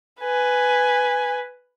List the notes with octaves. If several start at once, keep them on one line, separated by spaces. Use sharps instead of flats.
B4 G#5